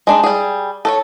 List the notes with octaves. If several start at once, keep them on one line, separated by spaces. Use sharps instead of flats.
G#3 D4 D#4
G3 G#4
A4 A#4 C#5